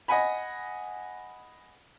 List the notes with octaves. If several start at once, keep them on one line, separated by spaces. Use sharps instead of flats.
D#5 F#5 G#5 B5